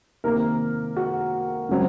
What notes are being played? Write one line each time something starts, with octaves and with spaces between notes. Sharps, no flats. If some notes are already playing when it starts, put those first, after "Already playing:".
C3 D#3 A#3 A#4
F#4
C#3 F#3 C4